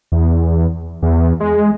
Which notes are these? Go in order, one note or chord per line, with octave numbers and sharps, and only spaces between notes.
E2
E2
G#3